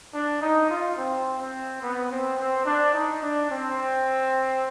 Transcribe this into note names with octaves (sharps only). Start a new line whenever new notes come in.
D4
D#4
F4
C4
C4
B3
C4
C4
D4
D#4
D4
C4